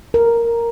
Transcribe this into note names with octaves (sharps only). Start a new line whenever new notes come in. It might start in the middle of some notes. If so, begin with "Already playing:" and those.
A#4